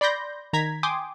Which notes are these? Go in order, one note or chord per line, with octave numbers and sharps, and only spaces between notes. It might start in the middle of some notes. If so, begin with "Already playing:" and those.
D5 B5 C6 G6 A#6
D#3 A#5 G#6 B6
G5 G#5 C6 D6 D#6